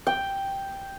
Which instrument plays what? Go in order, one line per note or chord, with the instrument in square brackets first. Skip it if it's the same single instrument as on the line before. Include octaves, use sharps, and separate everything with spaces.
[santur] G5